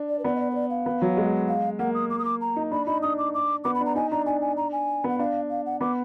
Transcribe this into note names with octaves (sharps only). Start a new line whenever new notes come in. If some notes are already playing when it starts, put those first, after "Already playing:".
Already playing: D4
D5
B4
B3 D5
D#5
D5
B4
D5
F5
B3
F#3
G#3
F5
A#3 F#5
D#6
D6
D#6
D6
A#5
D#4
D4 B5
D#4 B5
D4 D#6
D6
D6
B3 D6
B5
D4
A#5
D#4 G#5
D4 A#5
D4 G#5
G#5
A#5
G#5
B3
F#5
D4 F5
F5
F#5
B3 D6